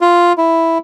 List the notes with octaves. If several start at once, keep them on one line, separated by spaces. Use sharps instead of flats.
F4
E4